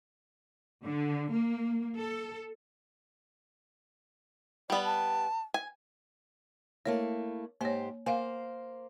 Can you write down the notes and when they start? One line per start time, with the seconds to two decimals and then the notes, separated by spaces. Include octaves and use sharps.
0.84 D3
1.31 A#3
1.96 A4
4.70 G3 B3 D5
4.84 A5
5.54 G#5
6.86 A3 A#3 E4 C#5
7.61 G#2 A#3 G4 C5 C#5
8.06 A#3 C5 F5 F#5 G#5